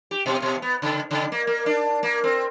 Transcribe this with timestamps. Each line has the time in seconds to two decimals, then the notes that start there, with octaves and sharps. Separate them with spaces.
0.11 G4
0.26 B2
0.42 B2
0.62 B3
0.82 C#3
1.11 C#3
1.32 A#3
1.47 A#3
1.66 D4
2.03 A#3
2.24 C4